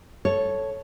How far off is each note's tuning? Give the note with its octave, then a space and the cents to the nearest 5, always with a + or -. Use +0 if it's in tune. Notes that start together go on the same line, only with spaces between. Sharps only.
A4 -5 C#5 +0